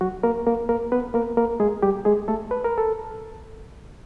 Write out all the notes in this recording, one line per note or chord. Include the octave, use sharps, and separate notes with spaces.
F#3 F#4
A#3 A#4
A#3 A#4
A#3 A#4
B3 B4
A#3 A#4
A#3 A#4
G#3 G#4
G3 G4
G#3 G#4
A3 A4
B4
A#4
A4